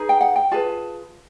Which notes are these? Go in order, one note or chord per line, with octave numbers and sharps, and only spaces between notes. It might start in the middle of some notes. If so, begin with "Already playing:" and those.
Already playing: D#4 G#4 B4
G5
F#5
G5
F4 G#4 B4 A5